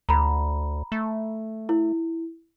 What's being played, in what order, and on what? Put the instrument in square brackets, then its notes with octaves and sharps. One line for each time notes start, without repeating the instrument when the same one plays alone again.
[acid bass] D2 [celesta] A#5 B5
[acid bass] A3
[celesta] E4